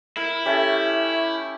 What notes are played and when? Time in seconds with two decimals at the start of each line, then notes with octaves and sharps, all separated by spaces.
0.17 E4 A#4
0.45 A3 C#4 G4